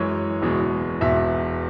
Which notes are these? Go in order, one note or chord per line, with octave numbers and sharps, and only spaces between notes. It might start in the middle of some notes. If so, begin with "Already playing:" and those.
Already playing: F#2 E3 G#3 C#5
F#1 E2 B2 G#3
E1 E2 B2 E5